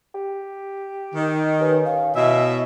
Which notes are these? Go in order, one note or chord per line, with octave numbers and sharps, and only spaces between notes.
G4
D#3
C#4 B4
F5
B2 E4 D#5 E5